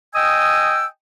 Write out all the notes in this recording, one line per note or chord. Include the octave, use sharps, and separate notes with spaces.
D#5 G5 G#5 D#6 E6